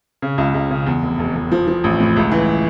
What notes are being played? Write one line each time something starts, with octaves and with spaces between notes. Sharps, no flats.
C#3
C#2
C#2
C#3
E2
F1
F1
F1
F3
F3
A1
A2
C#2
E3